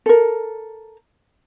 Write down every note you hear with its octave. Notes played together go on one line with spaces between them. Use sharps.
A4 A#4